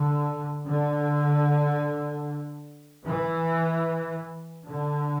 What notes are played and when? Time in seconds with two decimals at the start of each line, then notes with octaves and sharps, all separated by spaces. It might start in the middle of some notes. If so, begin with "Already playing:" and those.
Already playing: D3
0.67 D3
3.06 E3
4.67 D3